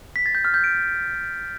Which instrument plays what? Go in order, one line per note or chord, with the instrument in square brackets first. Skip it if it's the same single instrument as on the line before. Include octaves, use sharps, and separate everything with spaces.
[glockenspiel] B6
A6
G6
F6
G6
D7